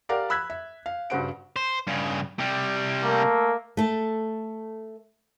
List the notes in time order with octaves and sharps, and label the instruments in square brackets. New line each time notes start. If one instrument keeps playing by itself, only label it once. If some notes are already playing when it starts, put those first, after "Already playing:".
[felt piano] G4 A#4 D5 F5 F#5
B5 E6 F#6 G#6 B6
E5
F5
G2 C#3 F#4 C5 F#5 D7
[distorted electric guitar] C5
G2 C#3
C3 G3
[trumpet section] A3 A#3
[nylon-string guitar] A3 A4